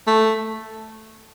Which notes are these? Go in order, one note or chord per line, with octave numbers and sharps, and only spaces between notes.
A3